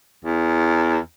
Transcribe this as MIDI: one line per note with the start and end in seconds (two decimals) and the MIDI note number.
0.25 0.98 40